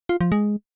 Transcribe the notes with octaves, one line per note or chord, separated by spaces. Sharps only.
F4
F3
G#3